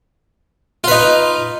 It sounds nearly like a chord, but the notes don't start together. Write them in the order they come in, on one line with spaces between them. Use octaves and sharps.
F4 B4 D#4